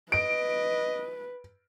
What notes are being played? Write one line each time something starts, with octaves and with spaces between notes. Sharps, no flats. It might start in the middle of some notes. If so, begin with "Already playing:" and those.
B4 D#5 D7